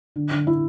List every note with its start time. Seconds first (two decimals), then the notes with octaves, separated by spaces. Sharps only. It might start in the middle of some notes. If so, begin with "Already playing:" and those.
0.16 D3
0.31 D3
0.47 E4